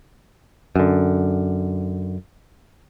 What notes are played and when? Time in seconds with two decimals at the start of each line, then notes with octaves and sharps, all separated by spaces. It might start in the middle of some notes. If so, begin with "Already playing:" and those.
0.76 F#2 D3